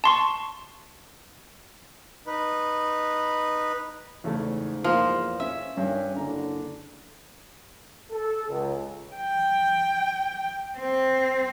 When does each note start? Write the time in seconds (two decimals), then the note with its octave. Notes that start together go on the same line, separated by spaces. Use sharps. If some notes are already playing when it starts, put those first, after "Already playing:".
0.04 A5 C6 C#6
2.27 D#4 B4
4.24 E2 G#2 C#3 A3
4.84 E2 F3 A#3
5.40 C#4 E5
5.77 G2 D#3 C#4
6.16 F#1 D3 A#5
8.11 A4
8.49 C#2
9.16 G5
10.78 C4